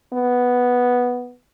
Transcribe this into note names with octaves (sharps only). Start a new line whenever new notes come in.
B3